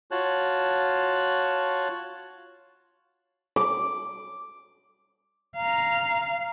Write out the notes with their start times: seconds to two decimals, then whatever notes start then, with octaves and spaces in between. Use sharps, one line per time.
0.11 F4 F#4 C#5 A5 F#6
3.56 D6
5.56 F5 A#5